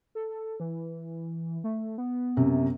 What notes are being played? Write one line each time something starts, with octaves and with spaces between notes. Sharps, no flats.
A4
E3
A3
B3
F#2 C3